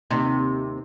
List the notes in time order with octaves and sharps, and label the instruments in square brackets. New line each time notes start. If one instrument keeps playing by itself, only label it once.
[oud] D#2 C3